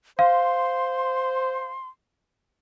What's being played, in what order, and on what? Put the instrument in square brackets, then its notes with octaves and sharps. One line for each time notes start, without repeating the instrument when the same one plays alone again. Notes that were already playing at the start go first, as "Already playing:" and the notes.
[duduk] C5 [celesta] F5 [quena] C6